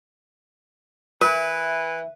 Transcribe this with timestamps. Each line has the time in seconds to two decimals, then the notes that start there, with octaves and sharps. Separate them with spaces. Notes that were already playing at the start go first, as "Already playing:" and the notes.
1.22 E3 A#4 B4 E5